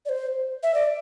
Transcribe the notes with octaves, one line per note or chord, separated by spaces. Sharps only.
D5
C5
E5
D5